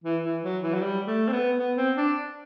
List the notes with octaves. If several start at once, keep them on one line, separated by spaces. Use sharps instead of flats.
E3
E3
F#3
E3
F#3
G3
A3
C4
B3
B3
C4
D4